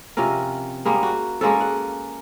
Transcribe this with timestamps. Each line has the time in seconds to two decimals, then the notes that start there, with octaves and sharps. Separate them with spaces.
0.17 C3 F3 C#4 A#4
0.85 G3 G#3 A#3
1.03 F#4
1.41 G#3 A#3 C#4 A4
1.61 F#5